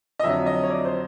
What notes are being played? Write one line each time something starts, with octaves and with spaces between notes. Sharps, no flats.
D#5
F2 D3 F#3 E5
D#5
C#5
D5
C5